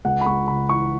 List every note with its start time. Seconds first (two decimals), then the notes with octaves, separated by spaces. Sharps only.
0.05 C#2 F#5
0.21 B5
0.26 C#2 C#6
0.48 C#3 B5
0.69 E3 C#6